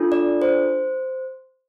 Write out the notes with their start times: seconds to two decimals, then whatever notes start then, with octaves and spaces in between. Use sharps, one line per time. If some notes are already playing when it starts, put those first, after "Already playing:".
Already playing: D4 F4 A4
0.12 D5
0.42 C5